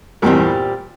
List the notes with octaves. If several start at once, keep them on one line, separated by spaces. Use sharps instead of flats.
E2 G2 A#2 G3 C4 G4 A#4